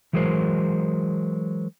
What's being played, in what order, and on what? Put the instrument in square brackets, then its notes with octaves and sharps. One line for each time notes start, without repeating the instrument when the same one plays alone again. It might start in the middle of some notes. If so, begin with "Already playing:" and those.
[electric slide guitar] E3 F#3 G#3 A#4 C5